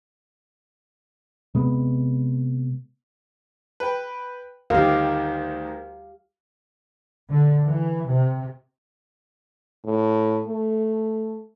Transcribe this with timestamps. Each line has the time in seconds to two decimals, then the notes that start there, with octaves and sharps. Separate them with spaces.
1.55 C3 G#3 B3
3.80 B4 G5
4.70 D2 D#3 G4 A#4 F5
7.30 D3
7.67 E3
8.08 C3
9.85 A2
10.47 A3